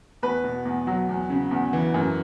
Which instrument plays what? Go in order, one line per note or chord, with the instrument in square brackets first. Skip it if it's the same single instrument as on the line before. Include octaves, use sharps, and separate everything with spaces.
[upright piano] E2 B4
B2
E2
F#3
E2
C#3
E2
E3
F#2